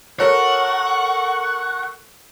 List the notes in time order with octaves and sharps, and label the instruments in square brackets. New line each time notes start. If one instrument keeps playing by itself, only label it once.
[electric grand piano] F#4 A4 A#4 [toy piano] C#5 [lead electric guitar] F#5 [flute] C#6